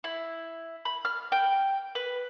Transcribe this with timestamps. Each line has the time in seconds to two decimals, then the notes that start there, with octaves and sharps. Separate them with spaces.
0.04 E4
0.85 B5
1.05 F6
1.32 G5
1.95 B4